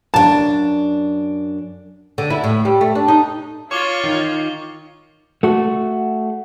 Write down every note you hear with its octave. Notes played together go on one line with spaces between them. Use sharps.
F#2 D4 A5
D3
E4
A2
G3
A3
D4
D#4
F4 C#5 C#6 D6 G7
D#3
A3 F#4